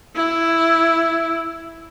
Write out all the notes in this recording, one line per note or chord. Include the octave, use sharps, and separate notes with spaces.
E4